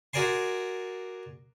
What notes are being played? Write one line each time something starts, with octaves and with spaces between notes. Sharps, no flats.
F#4 G#4 A#4 D5 G#5 C6